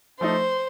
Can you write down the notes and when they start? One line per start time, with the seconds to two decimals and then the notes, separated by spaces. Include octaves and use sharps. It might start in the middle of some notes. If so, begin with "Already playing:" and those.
0.20 F3 A3 D#4 C5